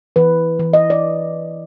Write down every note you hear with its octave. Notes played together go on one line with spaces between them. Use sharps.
E3 B4
E3
D#5
D5